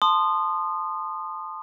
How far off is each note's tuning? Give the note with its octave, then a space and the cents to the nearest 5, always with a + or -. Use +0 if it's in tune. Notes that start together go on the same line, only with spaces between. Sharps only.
A5 +0 C6 -5 D#6 -25